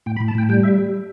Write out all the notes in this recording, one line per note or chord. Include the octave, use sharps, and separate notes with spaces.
A2 G5
B5
A2
A5
A2 G5
G3 G5
E5